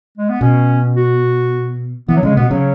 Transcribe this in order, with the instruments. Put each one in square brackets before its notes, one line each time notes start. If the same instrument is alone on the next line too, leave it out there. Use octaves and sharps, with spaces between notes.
[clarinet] G#3
B3
[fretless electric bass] B2 [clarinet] C#4
[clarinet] F#4
[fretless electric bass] E3 [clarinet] B3
[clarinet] F#3
[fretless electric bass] C#3 [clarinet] G#3
[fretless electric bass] B2 [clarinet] B3
[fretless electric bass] C#3 [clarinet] F#3